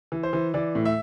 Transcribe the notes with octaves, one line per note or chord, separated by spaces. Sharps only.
E3
C5
E3
E3 D5
A2
E5